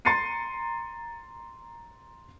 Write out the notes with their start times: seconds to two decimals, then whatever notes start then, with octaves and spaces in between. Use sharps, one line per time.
0.05 A#5 C6 A6 C7 C#7 D#7